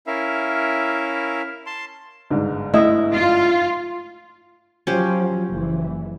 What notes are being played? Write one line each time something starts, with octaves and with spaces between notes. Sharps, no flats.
C#4 E4 A#4 E5 F5
A5 C6
G1 G#2
A3 E4 D#5
F4
F3 F#3 C#4 G4 C5
F#1 E3